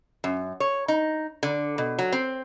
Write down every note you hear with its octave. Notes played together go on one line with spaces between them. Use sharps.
F#2
C#5
D#4
D3
B2
F#3
C4